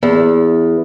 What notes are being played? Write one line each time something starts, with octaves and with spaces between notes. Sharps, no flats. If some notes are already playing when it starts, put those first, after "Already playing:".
E2